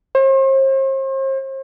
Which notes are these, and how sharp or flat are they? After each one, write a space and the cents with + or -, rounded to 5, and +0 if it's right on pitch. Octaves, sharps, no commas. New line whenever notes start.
C5 +40